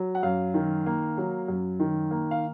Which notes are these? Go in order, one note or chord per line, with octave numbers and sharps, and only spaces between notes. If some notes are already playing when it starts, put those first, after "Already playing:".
Already playing: F#3
F#5
F#2 F5
D#3
A#3
F#3
F#2
D#3
A#3
F5